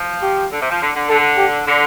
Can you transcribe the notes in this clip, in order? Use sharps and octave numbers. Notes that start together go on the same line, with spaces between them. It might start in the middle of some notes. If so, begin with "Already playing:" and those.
Already playing: F3
G4
D3
C3
F3
D3
D3
D3 A4
G4
D3